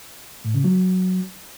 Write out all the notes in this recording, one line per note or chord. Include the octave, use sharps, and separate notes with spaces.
A2
C#3
F#3